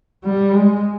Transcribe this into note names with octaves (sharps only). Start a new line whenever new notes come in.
G3
G#3